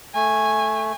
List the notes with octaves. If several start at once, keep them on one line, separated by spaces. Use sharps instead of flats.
A3 G#5